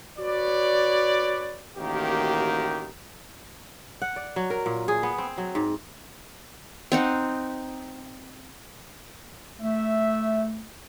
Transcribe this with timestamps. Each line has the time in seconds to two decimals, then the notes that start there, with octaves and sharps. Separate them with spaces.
0.18 F#4 B4 C#5 D5
1.76 A1 D#3 A#3 F#4 G4
4.02 F#5
4.16 D5
4.36 F#3
4.50 A#4
4.66 A#2
4.88 G#4
5.03 B3
5.18 C4
5.38 F#3
5.55 G#2
6.92 C4 D#4 F#5
9.61 A3 E5